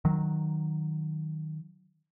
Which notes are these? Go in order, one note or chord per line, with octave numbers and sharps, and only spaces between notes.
D#3 F#3